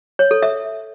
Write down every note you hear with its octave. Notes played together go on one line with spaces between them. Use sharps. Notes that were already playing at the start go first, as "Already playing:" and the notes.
C#5
A4
E5